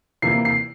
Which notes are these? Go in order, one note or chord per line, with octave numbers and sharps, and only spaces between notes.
C3 E3 A#3 E4 C7
C7